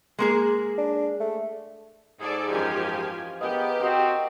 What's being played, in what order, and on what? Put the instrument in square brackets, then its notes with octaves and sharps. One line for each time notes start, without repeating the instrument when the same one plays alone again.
[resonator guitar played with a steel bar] G#3 A#3 G#4
[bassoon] D4
A3
[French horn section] G#2 [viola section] G#4 A4 D5
[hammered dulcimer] F#2 E3 C5 [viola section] F3 G4 G#5
[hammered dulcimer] F5
[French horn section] B3 [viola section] G4 [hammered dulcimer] G#4 A#4 D#5
[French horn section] C4 F#4 [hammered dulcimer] D#5 G5